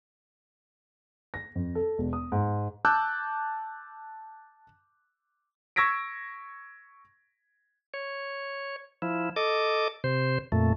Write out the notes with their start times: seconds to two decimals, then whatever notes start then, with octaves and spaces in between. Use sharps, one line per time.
1.34 A#6
1.55 F2
1.75 A4
1.98 E1
2.13 D#6
2.32 G#2
2.85 A5 D6 E6 F#6 G6
5.76 C#6 E6 G#6 A#6 B6 D7
7.94 C#5
9.02 F3 E4
9.36 A4 D#5 D6
10.04 C3 C5
10.52 F2 A#2 A3